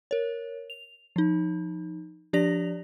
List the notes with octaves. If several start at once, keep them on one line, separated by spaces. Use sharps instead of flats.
A#4 C#5
F7
F3 D#4
F3 D4 G4 D5 A#6 F7